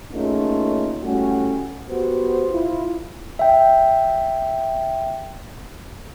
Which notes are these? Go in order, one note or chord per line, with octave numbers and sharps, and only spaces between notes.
A3 A#3 C#4 D#4 F4 G#4
A2 G3 A3 C#4 F#4
B3 F#4 G4 C5
E4 F4
E5 G5